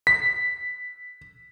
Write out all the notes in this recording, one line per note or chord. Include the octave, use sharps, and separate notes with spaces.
B6